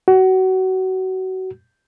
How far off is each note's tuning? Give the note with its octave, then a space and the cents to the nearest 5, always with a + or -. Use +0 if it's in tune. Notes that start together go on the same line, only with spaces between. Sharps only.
F#4 +25